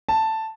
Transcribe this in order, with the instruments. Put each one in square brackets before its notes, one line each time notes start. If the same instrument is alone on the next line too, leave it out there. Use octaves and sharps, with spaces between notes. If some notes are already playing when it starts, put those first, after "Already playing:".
[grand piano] A5